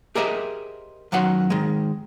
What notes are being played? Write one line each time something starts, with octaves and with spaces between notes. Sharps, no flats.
G4 G#4 A#4 C5 D#5 E5
F#2 D#3 F#3 F#5 C6
D#3 G#3